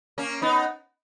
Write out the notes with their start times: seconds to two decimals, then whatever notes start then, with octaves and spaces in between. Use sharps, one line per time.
0.18 A#3 C#4
0.42 B3 D#4